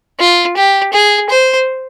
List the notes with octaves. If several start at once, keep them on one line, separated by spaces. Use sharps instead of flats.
F4
G4
G#4
C5